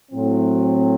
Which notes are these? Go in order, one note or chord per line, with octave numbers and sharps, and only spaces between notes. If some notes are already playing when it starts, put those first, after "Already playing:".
A2 F#3 C4